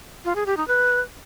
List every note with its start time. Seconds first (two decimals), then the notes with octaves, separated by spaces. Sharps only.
0.25 F4
0.35 G#4
0.46 G4
0.57 D#4
0.68 B4